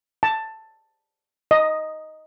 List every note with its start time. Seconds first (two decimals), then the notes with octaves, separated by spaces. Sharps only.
0.23 A5
1.51 D#5